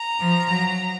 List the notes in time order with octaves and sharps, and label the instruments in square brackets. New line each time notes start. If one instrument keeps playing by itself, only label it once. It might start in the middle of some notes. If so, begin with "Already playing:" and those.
Already playing: [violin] A#5
[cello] F3
F#3